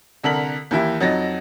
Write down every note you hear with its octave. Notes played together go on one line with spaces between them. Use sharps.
C2 D3 A4 A#4 B6 F#7
D#2 E3 E4 G4
F2 F#3 D#4 A6 A#6